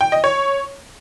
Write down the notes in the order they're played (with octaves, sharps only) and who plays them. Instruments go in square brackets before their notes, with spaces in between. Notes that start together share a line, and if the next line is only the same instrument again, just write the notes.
[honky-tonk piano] G5
D#5
C#5